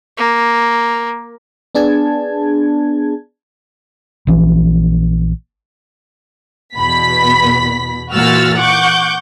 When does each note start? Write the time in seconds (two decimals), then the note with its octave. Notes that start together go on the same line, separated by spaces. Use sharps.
0.17 A#3
1.75 B3 D4 G#4 A5 G#6
4.27 A#1 E3
6.75 E2 B2 B5 B6
8.14 A#2 E3 F#4 E6 F6 A6
8.58 F#5 C#6 D6 G6